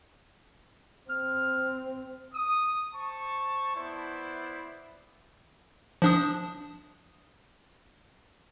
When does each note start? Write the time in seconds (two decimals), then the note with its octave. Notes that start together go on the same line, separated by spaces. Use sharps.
1.09 C4 F6
2.34 D#6
2.94 C5 A5 C#6
3.76 B3 E4 B4 C5 D5
6.02 F3 D4 D#6